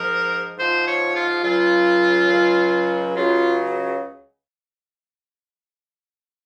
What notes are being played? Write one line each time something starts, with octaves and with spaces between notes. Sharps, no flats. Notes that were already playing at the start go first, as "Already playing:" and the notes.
Already playing: G#2 F3 A#4
G#2 F3 C5
C#5
F4
C#2 C#3 F#3 F4
C#2 C#3 F#3
C#2 C#3 F#3 F4